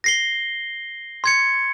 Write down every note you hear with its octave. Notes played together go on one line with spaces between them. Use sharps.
A#6 C7 G7
C6 G#6 C#7